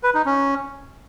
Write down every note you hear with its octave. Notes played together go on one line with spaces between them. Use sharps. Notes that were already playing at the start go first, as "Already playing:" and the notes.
B4
D#4
C#4